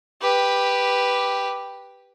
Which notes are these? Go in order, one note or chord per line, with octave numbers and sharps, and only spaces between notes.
G4 B4